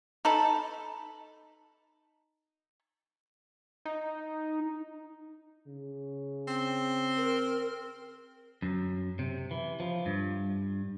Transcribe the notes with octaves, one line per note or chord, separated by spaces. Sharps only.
D#4 A4 A5 B5
D#4
C#3
C4
A#4
F#2
C3
E3
F3
G2